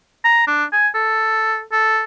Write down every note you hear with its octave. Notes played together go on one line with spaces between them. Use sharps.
A#5
D4
G#5
A4
A4